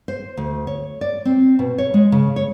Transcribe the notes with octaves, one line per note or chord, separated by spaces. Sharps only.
C5
D2
C#5
D5
C4
B2
C#5
G#3
C#3
C#5